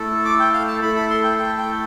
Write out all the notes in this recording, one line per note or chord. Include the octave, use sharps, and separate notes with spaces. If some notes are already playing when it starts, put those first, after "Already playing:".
Already playing: A3 E4 A4
D6
G5
F5
A5
A3 E4 A4 B5
B5
C6
G5
G5
G5